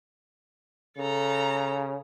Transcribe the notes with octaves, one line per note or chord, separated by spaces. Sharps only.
C#3 A4 A#5